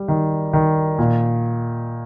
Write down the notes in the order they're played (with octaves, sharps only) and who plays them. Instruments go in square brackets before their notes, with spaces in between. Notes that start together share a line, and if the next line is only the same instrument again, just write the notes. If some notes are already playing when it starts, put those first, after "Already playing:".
Already playing: [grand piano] G3
D#3
D#3
A#2